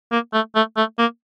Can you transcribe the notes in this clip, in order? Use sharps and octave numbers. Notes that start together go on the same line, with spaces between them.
A#3
A3
A3
A3
A#3